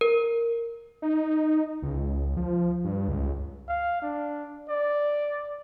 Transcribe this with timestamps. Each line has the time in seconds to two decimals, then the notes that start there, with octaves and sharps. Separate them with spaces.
0.01 A#4
1.02 D#4
1.82 C#2
2.37 F3
2.84 G2
3.08 C#2
3.68 F5
4.02 D4
4.69 D5